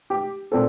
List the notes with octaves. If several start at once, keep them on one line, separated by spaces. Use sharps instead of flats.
G4
A#2 C4 A4